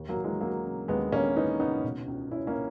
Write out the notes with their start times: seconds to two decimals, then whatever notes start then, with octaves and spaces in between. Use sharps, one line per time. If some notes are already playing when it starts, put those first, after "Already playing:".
Already playing: D#2
0.09 F#3 A#3
0.17 D#2
0.24 E3 G#3
0.41 E3 F#3 A#3
0.64 C#3
0.88 D#2 G#3 B3
1.12 D#2 A#3 C#4
1.36 E3 B3 D#4
1.59 C#3 B3 D#4
1.84 B2
2.08 C#2
2.31 C#2 C#4 E4
2.47 A#3 C#4